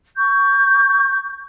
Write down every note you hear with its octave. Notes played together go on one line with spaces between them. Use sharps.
C#6 G6